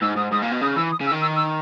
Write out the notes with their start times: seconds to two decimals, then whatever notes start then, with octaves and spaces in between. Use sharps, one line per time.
0.02 G#2 E6
0.16 G#2 D#6
0.32 G#2 D#6
0.42 A#2
0.52 B2
0.61 C#3 D#6
0.76 E3 E6
0.92 D#6
1.01 C#3
1.06 E6
1.11 D#3
1.22 E6
1.36 E6